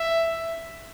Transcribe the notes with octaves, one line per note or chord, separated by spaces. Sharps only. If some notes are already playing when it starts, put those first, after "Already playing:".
Already playing: E5